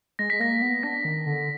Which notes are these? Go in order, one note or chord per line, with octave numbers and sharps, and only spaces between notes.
G#3 A#6
G#3 B6
A#3 A#6
B3
D4 A#6
D#3
D3